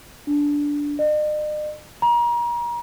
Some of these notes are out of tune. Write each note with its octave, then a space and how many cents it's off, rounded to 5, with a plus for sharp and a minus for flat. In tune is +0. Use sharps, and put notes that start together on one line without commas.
D4 -10
D#5 -45
A#5 +35